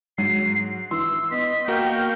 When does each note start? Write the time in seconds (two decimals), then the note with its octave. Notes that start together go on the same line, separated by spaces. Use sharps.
0.18 G#2 F#3 F#4 C7
0.91 E3 C6 E6
1.31 B3 D#5 B6
1.68 A#3 F#4 A#4 F5 G5